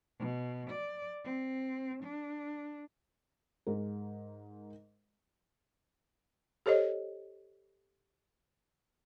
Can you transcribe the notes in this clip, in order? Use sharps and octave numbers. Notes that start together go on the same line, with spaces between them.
B2
D5
C4
D4
G#2 G#3 A#4
G4 A4 C5 C#5 D#5